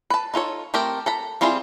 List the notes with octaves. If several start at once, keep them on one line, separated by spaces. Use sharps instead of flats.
B4 A5
D#4 F4 A4 C#5
A3 C4 G4 A#4
A4 A#5 B5
G3 C4 E4 F4 G#4